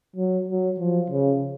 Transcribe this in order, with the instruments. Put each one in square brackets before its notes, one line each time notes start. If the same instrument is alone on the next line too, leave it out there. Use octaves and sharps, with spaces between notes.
[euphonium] F#3
F#3
F3
C#3